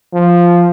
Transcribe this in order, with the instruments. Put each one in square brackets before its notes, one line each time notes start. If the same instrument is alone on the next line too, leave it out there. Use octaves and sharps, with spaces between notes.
[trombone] F3